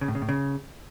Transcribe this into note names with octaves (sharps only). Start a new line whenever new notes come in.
C#3
A2
C#3
A2
C#3